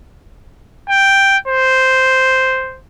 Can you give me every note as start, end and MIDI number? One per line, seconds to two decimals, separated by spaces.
0.89 1.37 79
1.48 2.79 72